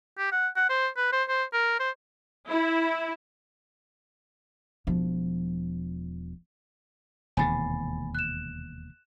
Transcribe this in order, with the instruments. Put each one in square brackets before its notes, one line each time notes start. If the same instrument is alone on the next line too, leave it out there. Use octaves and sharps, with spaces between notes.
[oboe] G4
F#5
F#5
C5
B4
C5
C5
A#4
C5
[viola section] E4
[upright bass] E1 F3
[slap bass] E1 D#2 C3 [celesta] G#5 B5 A6
[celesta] F#6 E7